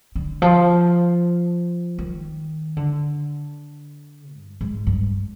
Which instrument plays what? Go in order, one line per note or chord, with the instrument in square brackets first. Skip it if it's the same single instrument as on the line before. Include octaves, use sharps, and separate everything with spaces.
[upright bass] D3
F3
D#3
D3
G2
G#2
G2